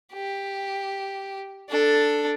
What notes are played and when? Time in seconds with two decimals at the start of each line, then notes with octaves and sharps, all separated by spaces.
0.13 G4
1.69 D4 A4